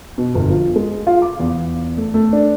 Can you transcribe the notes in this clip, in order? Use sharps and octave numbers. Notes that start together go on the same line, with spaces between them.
B2
G1
F3
G#3
F4
D6
E2
A3
A3
D4